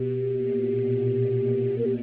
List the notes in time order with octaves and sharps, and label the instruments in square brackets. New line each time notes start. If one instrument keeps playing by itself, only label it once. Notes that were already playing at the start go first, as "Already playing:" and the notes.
Already playing: [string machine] B2 [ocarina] G4
[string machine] A#2
A#2
[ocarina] A#4
G4